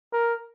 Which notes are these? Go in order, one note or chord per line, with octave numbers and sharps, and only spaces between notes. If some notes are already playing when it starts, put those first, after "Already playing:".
A#4